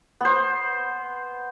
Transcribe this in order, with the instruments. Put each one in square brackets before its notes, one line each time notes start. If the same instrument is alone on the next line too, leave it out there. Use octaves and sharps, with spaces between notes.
[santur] B3 C5